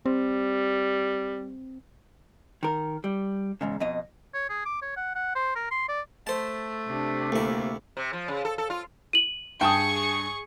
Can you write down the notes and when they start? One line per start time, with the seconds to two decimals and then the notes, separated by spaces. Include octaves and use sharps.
0.06 G3 C4
2.63 D#3 A#4
3.04 G3
3.61 E2 G#2 C#3
3.80 F2 B2 D#5
4.34 C#5
4.49 G#4
4.65 D6
4.82 C#5
4.96 F#5
5.15 F#5
5.35 C5
5.55 A#4
5.71 C6
5.88 D5
6.27 A3 C5 A5
6.87 C3 D4
7.32 D2 A#3 E4
7.97 C3
8.13 F3
8.28 C#3
8.45 A4
8.58 A4
8.70 F4
9.13 D#7 F#7
9.61 G2 G#4 G5 A5 C#6 D#6